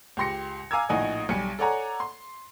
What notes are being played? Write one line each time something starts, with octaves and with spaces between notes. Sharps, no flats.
C#2 G4 C6 A#6 C#7
F5 G#5 A#5 D6 E6 G#6
A#1 A2 D#4 F#5 G#5 D#6
B1 G3 G#5 C#7
A4 C#5 D5 F#5 G#5 A#5
C6